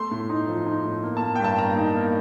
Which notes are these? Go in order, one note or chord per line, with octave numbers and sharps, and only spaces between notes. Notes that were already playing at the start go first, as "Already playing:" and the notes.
Already playing: A3 C6
A2
D#4
F3
D#4
A2
A#3
A5
A#3
G5
G2 A5
A#3 A#5
D#4
A#3